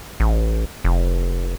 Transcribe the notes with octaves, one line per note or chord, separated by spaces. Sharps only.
A1
F1